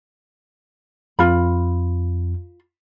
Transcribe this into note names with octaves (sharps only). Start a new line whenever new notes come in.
F2 F4 B5